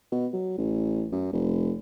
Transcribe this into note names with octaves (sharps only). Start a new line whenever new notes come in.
B2
F#3
A1
F#2
F1